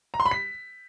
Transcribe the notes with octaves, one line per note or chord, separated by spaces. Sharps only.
A#5
C6
B5
B6